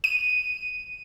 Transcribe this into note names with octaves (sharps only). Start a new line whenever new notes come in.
D#7